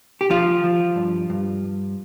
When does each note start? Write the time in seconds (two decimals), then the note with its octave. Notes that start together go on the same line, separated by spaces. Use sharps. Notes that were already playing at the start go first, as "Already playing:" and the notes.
0.21 G4
0.30 F3 F4
0.64 F3
0.96 G2
1.30 G2